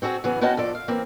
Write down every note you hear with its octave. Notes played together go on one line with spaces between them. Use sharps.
C4 F#4 G#4 A4
C#3 E3 F#3 B3 G#4
B3 C#4 F#4 D#5 G5 A5
F2 A4 D5
F5
E3 A#3 C4